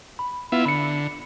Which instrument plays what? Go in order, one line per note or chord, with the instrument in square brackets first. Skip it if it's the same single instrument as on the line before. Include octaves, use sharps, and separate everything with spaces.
[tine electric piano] B5
[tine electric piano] B3 [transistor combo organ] E4 F4 E5
[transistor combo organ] D3 [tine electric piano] B5 C#7